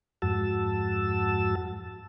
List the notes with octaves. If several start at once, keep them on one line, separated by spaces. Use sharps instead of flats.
F2 G#2 F#4 A5 E6